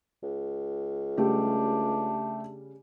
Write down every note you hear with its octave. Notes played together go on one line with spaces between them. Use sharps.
C#2
C#3 G3 A3 D4 G4